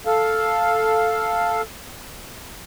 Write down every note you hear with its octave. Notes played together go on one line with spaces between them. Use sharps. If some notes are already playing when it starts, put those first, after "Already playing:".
A4 F5